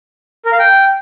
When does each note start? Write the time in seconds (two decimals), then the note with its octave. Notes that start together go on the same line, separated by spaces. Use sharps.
0.45 A#4
0.52 F5
0.59 G5